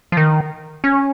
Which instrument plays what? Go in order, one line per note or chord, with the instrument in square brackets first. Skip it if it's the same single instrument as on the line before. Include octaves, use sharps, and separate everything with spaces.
[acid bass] F3
D#3
C#4